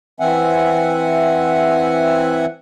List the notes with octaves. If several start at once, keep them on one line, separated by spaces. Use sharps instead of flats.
E3 C4 E5 F#5 G#5